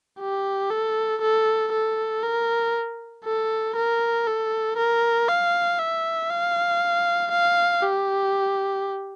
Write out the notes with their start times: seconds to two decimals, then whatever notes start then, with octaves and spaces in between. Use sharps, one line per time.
0.20 G4
0.70 A4
1.21 A4
1.72 A4
2.23 A#4
3.25 A4
3.76 A#4
4.27 A4
4.77 A#4
5.28 F5
5.79 E5
6.30 F5
7.31 F5
7.82 G4